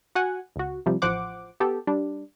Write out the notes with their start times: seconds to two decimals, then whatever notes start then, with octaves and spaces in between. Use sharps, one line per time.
0.15 F#4 F#5 G#5
0.56 C#2 F#4
0.86 C3 F3 G3
1.02 A1 F3 C5 F#5 D6
1.60 B3 G4 A4
1.87 G3 D4